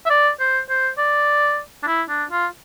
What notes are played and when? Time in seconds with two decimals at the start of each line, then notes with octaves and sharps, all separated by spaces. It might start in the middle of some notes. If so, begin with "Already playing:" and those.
0.06 E5
0.10 D5
0.40 C5
0.69 C5
0.98 D5
1.83 D4
1.87 E4
2.09 D4
2.31 F4